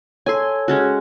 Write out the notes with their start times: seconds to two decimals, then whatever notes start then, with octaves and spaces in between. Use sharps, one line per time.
0.26 A4 C#5 G#5 C6
0.68 G#3 C#4 F#4